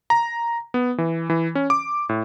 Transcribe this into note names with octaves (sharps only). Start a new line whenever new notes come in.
A#5
B3
E3
E3
C#4
D6
A2